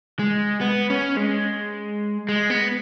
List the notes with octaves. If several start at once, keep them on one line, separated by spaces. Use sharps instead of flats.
G#3
B3
C#4
G#3
G#3
B3